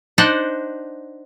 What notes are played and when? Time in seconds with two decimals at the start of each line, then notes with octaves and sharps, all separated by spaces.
0.18 D4 D#4 C5 D5 F#5